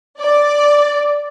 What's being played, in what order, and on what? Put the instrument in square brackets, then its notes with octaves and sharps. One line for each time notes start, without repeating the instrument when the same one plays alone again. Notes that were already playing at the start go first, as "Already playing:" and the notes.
[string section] D5